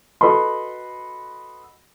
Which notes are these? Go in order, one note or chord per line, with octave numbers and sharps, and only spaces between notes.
F#4 A4 B4 D#5 B5 C6